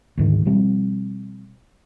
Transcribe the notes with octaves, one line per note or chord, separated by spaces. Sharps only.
D2 G#2 D#3
B2 F3 G3 C4